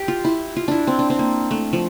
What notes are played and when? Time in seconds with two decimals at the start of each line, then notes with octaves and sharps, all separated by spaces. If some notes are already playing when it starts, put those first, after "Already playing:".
Already playing: G4
0.08 F4
0.25 E4
0.56 F4
0.68 D4 E4
0.87 C4
0.99 D4
1.10 C4
1.19 A#3
1.51 A3
1.73 F3